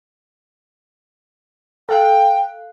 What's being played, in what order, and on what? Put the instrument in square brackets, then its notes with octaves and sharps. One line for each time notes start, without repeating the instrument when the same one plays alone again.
[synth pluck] A4 F5 F#6 [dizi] G5